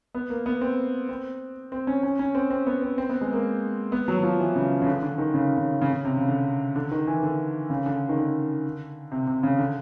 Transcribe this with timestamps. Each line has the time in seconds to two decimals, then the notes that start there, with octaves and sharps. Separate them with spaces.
0.15 B3
0.30 A#3
0.46 B3
0.61 C4
1.09 C4
1.72 C4
1.87 C#4
2.03 C#4
2.19 C#4
2.35 C4
2.51 C4
2.67 B3
2.82 C4
2.98 C4
3.09 B3
3.21 G#3
3.33 A#3
3.92 B3
4.08 F#3
4.19 F#3
4.23 F3
4.39 E3
4.55 C#3
4.82 C#3
4.87 D3
5.03 D3
5.18 D#3
5.34 C#3
5.57 C#3
5.82 C#3
5.93 C#3
6.05 C3
6.17 C#3
6.28 D3
6.76 D3
6.91 D#3
7.07 E3
7.23 D3
7.70 C#3
7.86 D3
8.09 D#3
8.18 D3
9.12 C3
9.27 C3
9.43 C#3
9.59 D3